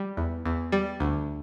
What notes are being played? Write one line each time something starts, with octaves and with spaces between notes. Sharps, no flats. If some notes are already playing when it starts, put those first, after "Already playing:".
Already playing: G3
E2
E2
G3
D2